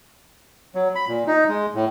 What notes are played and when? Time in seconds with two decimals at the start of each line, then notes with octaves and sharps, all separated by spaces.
0.75 F#3
0.95 B5
1.08 A#2
1.27 D#4
1.49 G#3
1.75 A2